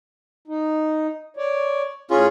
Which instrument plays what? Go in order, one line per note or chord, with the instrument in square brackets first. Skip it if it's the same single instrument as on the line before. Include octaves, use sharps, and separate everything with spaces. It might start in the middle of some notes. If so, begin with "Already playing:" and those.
[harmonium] D#4
C#5 D5
[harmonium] A2 [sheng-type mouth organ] C#4 F4 G#4